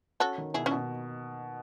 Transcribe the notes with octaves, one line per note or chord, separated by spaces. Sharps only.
C#4 F#4 A4
D#3
B2 E4 G#4
C#4 E4
B2